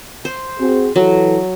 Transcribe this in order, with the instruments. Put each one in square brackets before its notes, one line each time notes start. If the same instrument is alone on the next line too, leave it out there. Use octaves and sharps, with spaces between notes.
[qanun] C5
[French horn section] C4 F#4 G#4
[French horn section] E3 E4 A4 [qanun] F#3